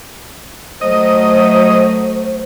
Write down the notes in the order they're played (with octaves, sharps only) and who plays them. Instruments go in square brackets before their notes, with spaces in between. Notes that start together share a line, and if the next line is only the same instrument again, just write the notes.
[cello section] F#3 A3 [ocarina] C5 [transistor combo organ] D#5